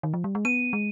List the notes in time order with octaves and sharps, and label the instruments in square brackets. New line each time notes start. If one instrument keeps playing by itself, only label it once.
[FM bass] D#3
F3
G3
G#3
[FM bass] B3 [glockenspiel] D#7
[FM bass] G#3